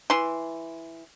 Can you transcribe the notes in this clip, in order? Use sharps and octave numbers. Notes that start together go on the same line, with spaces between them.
E3 C6